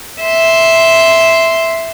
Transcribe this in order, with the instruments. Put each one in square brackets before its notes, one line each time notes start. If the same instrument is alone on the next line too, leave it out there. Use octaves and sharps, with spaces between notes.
[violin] E5 C6